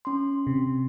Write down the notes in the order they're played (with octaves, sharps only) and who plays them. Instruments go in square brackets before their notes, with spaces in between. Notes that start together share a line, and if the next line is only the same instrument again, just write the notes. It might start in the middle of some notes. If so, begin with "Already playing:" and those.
[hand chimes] C#4 C6
[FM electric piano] C3